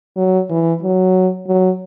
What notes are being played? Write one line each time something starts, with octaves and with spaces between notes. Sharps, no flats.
F#3
E3
F#3
F#3